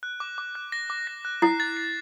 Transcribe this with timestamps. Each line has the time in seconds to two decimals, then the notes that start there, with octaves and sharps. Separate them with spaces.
0.03 F#6
0.20 D6
0.38 D6
0.55 F#6
0.72 A#6
0.90 D6
1.07 A#6
1.25 F#6
1.42 E4 C7
1.60 A6
1.77 C7